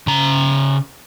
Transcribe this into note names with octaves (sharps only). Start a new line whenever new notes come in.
C#3 A#5